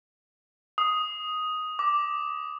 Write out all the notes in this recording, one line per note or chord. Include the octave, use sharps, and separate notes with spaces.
D#6
D6